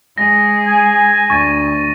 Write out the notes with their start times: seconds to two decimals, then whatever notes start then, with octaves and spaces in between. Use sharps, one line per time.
0.18 G#3 G#4 A#6
0.66 G#5
1.30 D2 C#6 A6 D#7